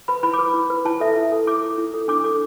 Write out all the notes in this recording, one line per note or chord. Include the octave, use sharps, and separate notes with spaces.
B4 B5
E4 B5
D6
B4
E4
B4
E4 A5
A4 E5
E4
A4
E4 D6
A4
E4
A4
D4 D6
A4 D6